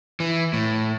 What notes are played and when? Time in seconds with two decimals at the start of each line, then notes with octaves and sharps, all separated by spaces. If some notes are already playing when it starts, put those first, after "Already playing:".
0.20 E3
0.53 A2